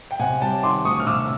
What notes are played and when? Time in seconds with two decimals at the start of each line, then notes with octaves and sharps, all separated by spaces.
0.11 G5
0.19 C3 F#5 G#5
0.41 G3 G5 A5
0.63 D#3 C6 D6
0.84 D2 C#6 D#6
1.00 F6
1.06 C3 D6 E6